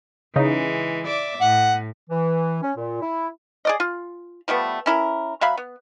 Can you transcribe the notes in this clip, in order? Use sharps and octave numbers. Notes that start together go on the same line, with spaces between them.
C#3 E3 G#3 D#4
D5 E5 D6
A2 F#5
E3
C#4
A#2
E4
G#4 D5 D#5
F4
F3 G3 A3 B3
C#4 E4 A#4
F#3 E5 F5 B5
B3